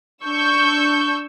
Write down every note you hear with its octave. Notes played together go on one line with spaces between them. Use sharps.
D4 C#6 E6 G6